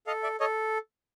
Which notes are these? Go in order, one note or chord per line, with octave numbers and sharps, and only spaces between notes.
A4 D#5 F5
D5 E5
A4 C#5 D#5